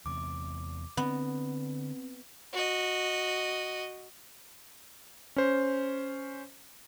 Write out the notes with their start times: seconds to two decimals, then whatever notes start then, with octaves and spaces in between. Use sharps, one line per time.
0.06 E2 C3 D6
0.97 D3 B3 C4 D4
2.53 F#4 D#5
5.36 C#4 C5